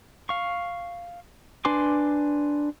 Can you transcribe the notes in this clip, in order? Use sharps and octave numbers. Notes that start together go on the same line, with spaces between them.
F5 C#6
D4 B4 G#5 C6 D6